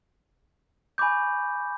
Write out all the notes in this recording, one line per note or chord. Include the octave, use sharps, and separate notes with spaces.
G#5 B5 C#6 D6 G6